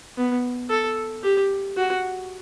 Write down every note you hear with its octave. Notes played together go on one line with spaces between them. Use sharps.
B3
A4
G4
F#4